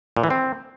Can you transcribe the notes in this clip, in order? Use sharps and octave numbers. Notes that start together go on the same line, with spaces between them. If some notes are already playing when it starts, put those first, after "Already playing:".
A#2
E3
C4